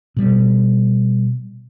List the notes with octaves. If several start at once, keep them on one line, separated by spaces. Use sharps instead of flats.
B2 G3